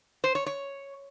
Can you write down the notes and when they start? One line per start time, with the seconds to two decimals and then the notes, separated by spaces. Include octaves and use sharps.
0.24 C5
0.35 C#5
0.46 C#5